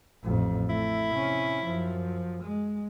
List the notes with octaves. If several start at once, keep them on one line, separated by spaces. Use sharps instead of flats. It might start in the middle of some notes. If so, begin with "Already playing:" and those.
A1 F2
A3 E4
C3 C#4
F#2 F3
G#3